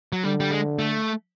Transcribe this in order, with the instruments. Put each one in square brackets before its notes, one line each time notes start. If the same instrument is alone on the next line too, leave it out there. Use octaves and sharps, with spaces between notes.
[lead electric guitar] F#3
[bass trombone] D3 [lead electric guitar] G3
[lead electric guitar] G3
G#3
A3